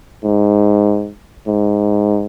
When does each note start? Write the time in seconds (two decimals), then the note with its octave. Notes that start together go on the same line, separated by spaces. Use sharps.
0.24 G#2
1.47 G#2